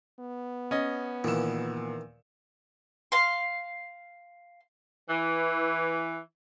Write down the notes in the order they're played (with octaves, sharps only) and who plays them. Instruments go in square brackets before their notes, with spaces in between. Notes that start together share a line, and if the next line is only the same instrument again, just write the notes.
[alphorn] B3
[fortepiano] C#4 D#5
[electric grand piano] A#2 A#4 E7 [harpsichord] D#3 E3
[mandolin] F5 C6
[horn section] E3